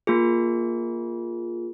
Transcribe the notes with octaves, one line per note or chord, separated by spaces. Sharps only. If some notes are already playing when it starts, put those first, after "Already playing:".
A#3 F4 G#4